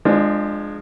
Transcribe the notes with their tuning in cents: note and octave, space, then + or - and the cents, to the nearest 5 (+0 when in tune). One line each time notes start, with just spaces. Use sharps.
F3 +0 G#3 +0 D4 +25